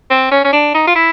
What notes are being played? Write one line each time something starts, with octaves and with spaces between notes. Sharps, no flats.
C4
C#4
C#4
D4
D#4
F4
E4